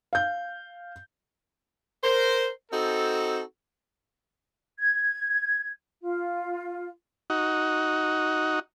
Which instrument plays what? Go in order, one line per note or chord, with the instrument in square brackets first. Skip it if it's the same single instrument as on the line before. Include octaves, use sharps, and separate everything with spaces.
[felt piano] F5 G6
[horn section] A#4 C5
C4 D#4 F#4 A4
[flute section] G#6
F4
[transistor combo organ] D#4 F#4